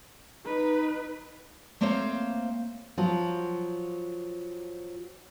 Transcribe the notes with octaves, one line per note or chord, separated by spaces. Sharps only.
D#4 B4
A3 A#3 C4 C5 C#5 F5
F3 F#3